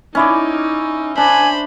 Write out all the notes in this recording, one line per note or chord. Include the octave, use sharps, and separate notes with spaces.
C#4 D#4 E4 D5
D4 C5 G#5 B5